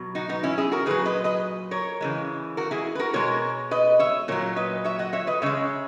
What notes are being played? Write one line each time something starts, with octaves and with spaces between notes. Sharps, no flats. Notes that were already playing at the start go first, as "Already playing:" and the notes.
Already playing: B2 F#3
D#4 F#4
B3 D#4
C#4 E4
E4 G#4
F#4 A#4
A#2 F#3 G#4 B4
B4 D#5
B4 D#5
A#4 C#5
C#3 E3 G#3
F#4 A#4
E4 G#4
B4
F#4 A#4
B2 G#3 A#4 C#5
B4 D#5
C#5 E5
A#2 F#3 A#4 C#5
B4 D#5
C#5 E5
D#5 F#5
C#5 E5
B4 D#5
C#3 G#3 C#5 E5